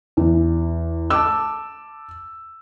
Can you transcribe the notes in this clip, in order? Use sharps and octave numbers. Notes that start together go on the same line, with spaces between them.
E2
A5 D6 E6